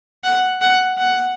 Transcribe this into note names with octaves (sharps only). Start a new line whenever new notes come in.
F#5
F#5
F#5